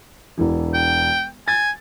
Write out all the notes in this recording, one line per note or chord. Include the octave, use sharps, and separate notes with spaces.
E1 E3
G5
G#5 A6